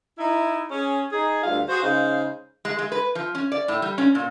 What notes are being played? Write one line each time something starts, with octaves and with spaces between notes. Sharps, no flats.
D#4 E4
C#4 G#4
D#4 G#4
D2 G2 G3 F4 F5
F#4 G#4 C5
C#3 G#3 D#4 C5 F5
G#3
G#3
B4
F3
C#4
D5
A2
G3
C#4
A#2